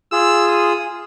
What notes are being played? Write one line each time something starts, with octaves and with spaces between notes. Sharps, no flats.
F4 G#4 E6
D#6